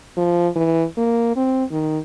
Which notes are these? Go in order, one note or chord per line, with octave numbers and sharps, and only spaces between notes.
F3
E3
A#3
C4
D#3